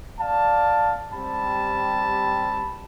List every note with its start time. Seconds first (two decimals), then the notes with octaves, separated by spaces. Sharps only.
0.20 D5 F5 A5
1.13 G3 C4 G4 A5 B5